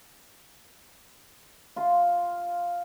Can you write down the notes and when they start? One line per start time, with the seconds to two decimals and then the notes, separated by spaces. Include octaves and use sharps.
1.76 F4 C6